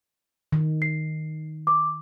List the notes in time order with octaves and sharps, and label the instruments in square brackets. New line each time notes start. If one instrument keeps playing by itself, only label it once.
[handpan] D#3
[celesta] C7
D6